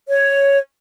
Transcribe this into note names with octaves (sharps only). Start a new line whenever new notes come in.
C#5